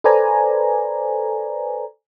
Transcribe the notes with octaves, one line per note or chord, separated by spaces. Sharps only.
A4 B4 C5 D5 G#5 A#5